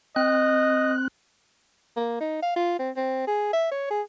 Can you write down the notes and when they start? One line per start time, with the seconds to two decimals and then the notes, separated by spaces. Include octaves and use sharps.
0.16 C4 D#5 F#6
1.97 A#3
2.21 D#4
2.42 F5
2.56 F4
2.79 C4
2.97 C4
3.27 G#4
3.53 E5
3.71 C#5
3.91 G#4